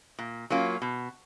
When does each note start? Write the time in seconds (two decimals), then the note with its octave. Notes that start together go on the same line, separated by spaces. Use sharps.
0.19 A#2
0.50 F#3 A#3 C#4 F4
0.82 B2